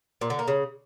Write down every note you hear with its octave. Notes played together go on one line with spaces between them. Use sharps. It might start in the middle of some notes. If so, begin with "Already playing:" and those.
A#2
D3
A#3
C#3